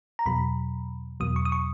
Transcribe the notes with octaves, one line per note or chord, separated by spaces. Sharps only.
A#5
E2 B2 F#3 B5
E2 B2 F#3 D#6
C#6
D#6
C#6